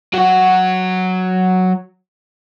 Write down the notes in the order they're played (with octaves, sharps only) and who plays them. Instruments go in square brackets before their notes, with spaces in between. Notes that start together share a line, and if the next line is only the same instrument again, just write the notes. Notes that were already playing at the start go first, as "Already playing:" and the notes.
[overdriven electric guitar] F#3 F#4